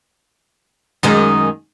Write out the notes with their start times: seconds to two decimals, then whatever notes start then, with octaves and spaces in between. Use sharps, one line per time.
1.03 F#2 D#3 G#3